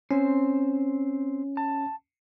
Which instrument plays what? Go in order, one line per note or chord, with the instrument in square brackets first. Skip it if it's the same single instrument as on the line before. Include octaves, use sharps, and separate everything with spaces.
[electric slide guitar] C4 C5 [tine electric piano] C#4
[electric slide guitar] A5